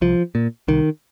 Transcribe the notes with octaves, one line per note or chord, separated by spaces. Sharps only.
C2 F3
A#2
C2 D#3